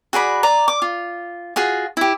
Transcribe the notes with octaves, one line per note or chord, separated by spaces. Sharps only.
F#4 G#4 D5 B5
D5 A#5
D6
F4
F4 F#4 G#4
E4 G4